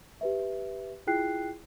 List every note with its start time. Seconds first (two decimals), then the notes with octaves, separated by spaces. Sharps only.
0.21 G4 B4 E5
1.07 E4 F4 G#4 G5 F#6 C7